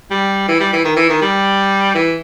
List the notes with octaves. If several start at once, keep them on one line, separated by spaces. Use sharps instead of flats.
G3
E3
G3
E3
D#3
E3
D#3
G3
E3